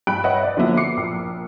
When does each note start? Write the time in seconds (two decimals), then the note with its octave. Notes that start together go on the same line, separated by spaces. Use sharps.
0.07 G2 G5 B5 F#6 D7
0.24 B4 C#5 D#5 E5 F#5
0.43 D5
0.57 D3 F3 F#3 A#3 B3 E4
0.77 D6 C7 C#7
0.97 A#1